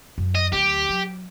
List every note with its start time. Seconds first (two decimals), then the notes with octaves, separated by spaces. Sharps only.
0.18 F#2
0.35 D#5
0.52 D2 F#3 G4
0.89 F#3